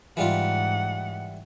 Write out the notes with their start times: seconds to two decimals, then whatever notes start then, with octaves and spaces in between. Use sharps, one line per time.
0.17 G#2 E3 G3 F4 F#5